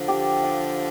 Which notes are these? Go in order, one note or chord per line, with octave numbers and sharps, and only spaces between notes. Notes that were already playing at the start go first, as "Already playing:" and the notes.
Already playing: D3 F3
G4
F5